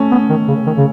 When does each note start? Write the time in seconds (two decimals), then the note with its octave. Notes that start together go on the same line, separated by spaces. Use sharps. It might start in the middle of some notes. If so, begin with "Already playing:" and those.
Already playing: A3 C#4
0.11 B3
0.30 D#3
0.48 C#3
0.66 D#3
0.77 C#3